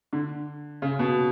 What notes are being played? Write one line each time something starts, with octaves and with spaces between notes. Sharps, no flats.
D3
C#3
B2